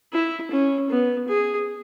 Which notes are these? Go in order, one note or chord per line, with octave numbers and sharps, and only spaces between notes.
E4
C#4
B3
G#4